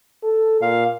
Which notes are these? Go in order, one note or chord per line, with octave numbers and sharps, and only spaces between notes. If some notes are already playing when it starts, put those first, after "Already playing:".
A4
A#2 F5